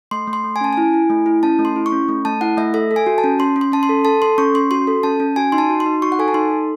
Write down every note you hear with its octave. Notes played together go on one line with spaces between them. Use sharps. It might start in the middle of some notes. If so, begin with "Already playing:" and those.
A3 C6
A3
C6
A3
G#5
C#4 A5
E4 G#5
E4
A3
E4
C#4 A5
A3
C6
E4
C#6
C#4
A3
A3 A5
E4 F#5
A3 E5
A4 E5
A4
G#5
F#4
A5
C#4
C#4 C6
C#4
C6
C#4 A5
C6
A4
A4 A5
A4 C6
C#4 C#6
C#4 C6
F#4 C6
A4
C#4 A5
C#4
F#4 G#5
D#4 C6
A5
F#4
C6
D#4
F#4 C#6
F#5
A4 G#5
A5
D#4 C6
A4